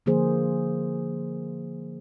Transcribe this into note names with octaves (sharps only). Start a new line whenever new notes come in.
D3 F3 A#3 G#4 C5